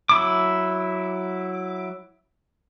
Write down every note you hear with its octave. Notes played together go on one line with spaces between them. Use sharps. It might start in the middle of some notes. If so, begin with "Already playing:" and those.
F#3 E4 D6